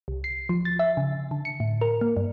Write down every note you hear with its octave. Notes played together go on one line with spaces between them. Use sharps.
C2
C7
F3
A6
E5
C#3
D3
C#7
A2
A#4
A#3
G2